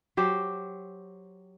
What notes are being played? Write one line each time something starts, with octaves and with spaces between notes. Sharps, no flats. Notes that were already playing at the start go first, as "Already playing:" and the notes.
F#3 G4 C5